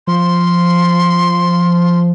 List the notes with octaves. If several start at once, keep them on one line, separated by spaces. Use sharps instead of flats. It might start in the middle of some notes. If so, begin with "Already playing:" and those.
F3 C6